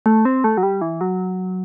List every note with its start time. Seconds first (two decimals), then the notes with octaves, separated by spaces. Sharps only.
0.06 A3
0.25 C4
0.44 A3
0.57 F#3
0.63 G3
0.81 E3
1.01 F#3